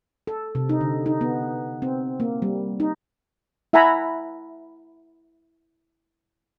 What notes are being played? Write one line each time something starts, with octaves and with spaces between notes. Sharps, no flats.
A4
C3
D#4
D3
D#4
B3
C4
A#3
G3
D#4
E4 E5 F#5 G#5 A#5 B5